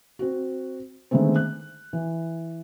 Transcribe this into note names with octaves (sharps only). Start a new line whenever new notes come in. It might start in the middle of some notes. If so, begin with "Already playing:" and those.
C4 F#4
D3 D#3 G#3 A3 B3 C4
F#6
E3